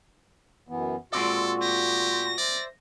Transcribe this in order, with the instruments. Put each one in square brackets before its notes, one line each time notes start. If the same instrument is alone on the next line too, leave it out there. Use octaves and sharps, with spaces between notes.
[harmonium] F#2 E3 B3
[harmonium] A#2 F#4 [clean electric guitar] G#3 C4 D5 [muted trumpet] A4
[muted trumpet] G4 [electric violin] A#6
[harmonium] C5 E5 [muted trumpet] D5